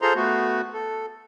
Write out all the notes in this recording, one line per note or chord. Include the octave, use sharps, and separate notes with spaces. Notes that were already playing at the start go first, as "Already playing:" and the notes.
F4 G#4 A4 C5 A#5 C6
A3 B3 F#4
A4